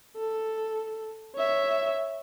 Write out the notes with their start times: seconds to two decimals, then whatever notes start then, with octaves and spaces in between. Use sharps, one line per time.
0.17 A4
1.36 C#5 E5